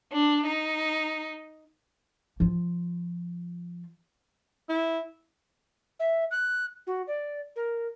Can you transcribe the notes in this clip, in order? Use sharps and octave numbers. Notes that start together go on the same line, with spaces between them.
D4
D#4
F3 F4
E4
E5
F#6
F#4
D5
A#4